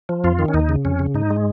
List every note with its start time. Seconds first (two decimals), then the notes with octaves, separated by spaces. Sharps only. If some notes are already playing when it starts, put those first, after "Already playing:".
0.09 F3
0.24 F2 F4
0.39 D#3
0.48 C#4
0.54 D#2 D#4
0.69 C#3
0.85 F2 C#4
0.99 C#3
1.15 G#2 D#4
1.30 G#3